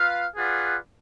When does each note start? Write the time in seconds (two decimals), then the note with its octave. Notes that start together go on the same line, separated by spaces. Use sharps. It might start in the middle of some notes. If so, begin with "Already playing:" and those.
Already playing: F4 B4 F5
0.36 F4 G#4 B4 D5 F#5